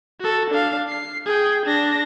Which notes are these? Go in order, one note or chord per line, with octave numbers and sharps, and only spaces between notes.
F#4 A4
D4 F5
C7
G#4 G5
D4 A#6